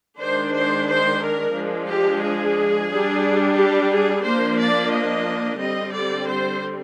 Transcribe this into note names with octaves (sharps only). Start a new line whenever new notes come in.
D#3 G#3 D4 C5
C5
C5
A#4
F3 G#3 D4
G4
G#4
G3 D4
G4
G#4
F3 A#3 D4 C5
D5
D#5
D3 G3 C4 D#5
D5
C5